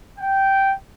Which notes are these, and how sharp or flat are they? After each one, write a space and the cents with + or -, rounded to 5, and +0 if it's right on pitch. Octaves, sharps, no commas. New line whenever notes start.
G5 -10